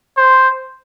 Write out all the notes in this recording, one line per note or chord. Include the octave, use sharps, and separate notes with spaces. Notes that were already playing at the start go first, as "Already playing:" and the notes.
C5